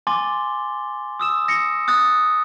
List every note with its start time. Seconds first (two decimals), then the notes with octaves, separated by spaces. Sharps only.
0.07 G#5 C6 D6 A6 G7
1.20 D#6 E6 E7
1.48 D#6 A#6 C#7
1.88 D#6 F#6 A6